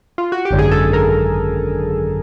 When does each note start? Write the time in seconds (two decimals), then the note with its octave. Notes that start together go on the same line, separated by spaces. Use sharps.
0.18 F4
0.32 F#4
0.45 G4
0.51 G#1 F#2 D3
0.59 G#4
0.71 A4
0.93 A#4